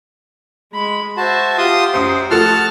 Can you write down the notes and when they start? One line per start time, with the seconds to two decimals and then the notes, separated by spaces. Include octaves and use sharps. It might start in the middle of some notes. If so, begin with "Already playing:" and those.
0.73 G#3 B5
1.17 F#4 C5 E5 A5
1.58 F4 G4 C6 D#6
1.94 F#2 C5 D#6 C7
2.31 F3 A3 F#4 A4 A5 F6